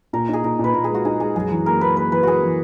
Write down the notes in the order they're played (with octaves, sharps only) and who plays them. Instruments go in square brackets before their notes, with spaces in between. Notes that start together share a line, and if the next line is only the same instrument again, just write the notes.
[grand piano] A#2 [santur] A#4
[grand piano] D#4 [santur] G#4
[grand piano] A#2 [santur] A#4
[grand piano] A#2 [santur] B4
[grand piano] A#2 [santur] A#4
[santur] G#4
[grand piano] G#3 [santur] F#4
[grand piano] D#4 [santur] G#4
[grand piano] G#3 [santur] G#4
[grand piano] F#2 [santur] G#4
[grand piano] E3
[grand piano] A#3 [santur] A#4
[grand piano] A#3 [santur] B4
[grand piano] A#3 [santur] B4
[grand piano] E3 [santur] B4
[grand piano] A#3 [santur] F#4 G#4
[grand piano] E3